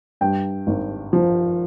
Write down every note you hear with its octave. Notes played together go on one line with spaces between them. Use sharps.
G2 G5
G#1
F3